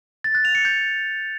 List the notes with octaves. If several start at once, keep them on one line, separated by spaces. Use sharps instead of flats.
A6
F#6
F7
C#7
G6